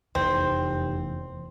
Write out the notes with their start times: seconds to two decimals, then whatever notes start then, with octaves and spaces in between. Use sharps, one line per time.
0.15 F1 E2 C4